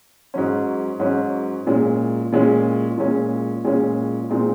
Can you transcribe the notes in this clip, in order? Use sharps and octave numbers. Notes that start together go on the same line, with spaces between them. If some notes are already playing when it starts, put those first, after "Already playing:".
G#2 F#3 C#4
G#2 F#3 C#4
A#2 G#3 C#4
A#2 G#3 C#4
A#2 G#3 C#4
A#2 G#3 C#4
A#2 G#3 C4 D#4